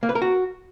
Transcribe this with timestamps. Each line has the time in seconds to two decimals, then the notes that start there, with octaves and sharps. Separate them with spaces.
0.03 A#3
0.09 B4
0.15 A#4
0.22 F#4